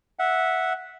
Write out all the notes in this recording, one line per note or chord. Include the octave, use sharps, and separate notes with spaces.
E5 F#5